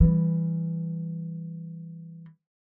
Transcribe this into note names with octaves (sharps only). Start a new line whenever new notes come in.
E3 G3